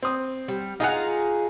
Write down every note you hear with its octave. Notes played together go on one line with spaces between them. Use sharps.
C4 D#6
G3
D#4 F4 G#4 F#5 A#5